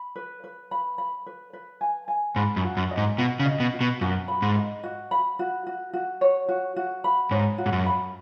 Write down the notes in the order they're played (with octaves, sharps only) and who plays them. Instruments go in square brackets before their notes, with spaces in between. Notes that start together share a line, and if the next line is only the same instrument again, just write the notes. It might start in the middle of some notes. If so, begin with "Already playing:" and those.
Already playing: [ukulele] B5
B4
B4
B5
B5
B4
B4
G#5
G#5
[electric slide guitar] G#2 [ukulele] B5
[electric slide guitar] F#2
[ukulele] F#4
[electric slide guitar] F#2
[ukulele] D#5
[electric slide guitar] G#2
[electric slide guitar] B2 [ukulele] F#4
[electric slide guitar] C#3
[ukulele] D#5
[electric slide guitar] B2
[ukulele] F#4
[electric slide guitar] B2
[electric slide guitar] F#2 [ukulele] F#4
[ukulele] B5
[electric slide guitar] G#2
[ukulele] D#5
F#4
B5
F#4
F#4
F#4
C#5
F#4
F#4
B5
[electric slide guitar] G#2 [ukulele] C#5
[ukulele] F#4
[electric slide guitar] G#2
F#2
[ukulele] B5